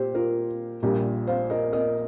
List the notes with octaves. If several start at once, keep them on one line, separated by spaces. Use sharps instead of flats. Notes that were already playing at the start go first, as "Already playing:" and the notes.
Already playing: A#2 G4 C5
F4 A#4
A#1 A#2 G3 G4
C5 F5
A#4 D#5
A#4 D#5